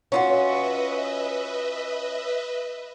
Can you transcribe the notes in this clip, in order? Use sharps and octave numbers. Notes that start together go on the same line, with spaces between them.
C#4 D#4 F4 F#4 B4 D#5 E5